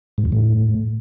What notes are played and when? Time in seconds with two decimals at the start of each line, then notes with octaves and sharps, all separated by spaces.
0.18 G#2
0.25 E2
0.32 A2